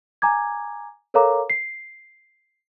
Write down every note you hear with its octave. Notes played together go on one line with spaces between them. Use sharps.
G#5 A#5 D6 G#6
A4 A#4 C#5 F5 A#5 D6
C7